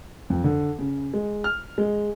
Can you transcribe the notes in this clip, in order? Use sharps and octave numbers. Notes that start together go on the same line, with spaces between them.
F2
D3
C#3
G#3
F6
G#3